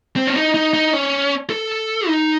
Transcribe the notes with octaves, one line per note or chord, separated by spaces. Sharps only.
C4
C#4
D#4
D#4
D#4
C#4
A4
D#4